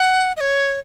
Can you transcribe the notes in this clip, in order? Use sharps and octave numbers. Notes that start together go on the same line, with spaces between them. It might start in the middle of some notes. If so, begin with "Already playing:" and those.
Already playing: F#5
D#5
C#5